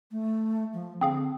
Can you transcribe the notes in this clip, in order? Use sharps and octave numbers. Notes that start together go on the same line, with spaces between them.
A3
F3
D3 C4 G#4 F5